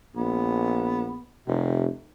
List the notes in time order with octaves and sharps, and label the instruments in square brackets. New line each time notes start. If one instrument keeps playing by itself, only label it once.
[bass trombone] A#1 [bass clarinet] B3
[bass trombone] F1 [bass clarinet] C3